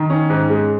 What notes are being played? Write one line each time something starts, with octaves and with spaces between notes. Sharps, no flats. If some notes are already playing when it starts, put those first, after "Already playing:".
Already playing: D#3
C#4
G#2
G#3